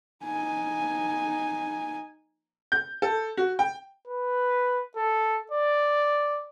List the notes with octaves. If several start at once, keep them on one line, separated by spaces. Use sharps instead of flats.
D#4 G#5
G6
A4
F#4
G5
B4
A4
D5